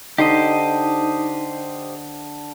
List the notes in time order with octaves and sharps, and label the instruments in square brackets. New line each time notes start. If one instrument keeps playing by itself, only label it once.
[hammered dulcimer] D3 [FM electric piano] D#4 [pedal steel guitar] G4 C5 D#5